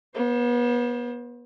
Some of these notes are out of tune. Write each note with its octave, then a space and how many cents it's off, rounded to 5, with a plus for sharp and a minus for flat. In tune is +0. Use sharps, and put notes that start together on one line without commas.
B3 -35 C5 +30